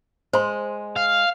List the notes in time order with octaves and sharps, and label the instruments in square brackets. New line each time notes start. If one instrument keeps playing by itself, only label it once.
[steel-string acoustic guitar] G#3 [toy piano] C5 C6
[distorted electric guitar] F5